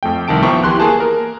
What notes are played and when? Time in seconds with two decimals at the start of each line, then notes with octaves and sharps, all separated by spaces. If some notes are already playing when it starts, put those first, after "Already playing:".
0.03 F2 A3 G5
0.28 C2 D#3 A5 D7
0.42 F3 B3 E5 G5 A#5 C#6
0.64 E3 G4 C6 F#6
0.80 A#3 G#4 A5
1.00 A#4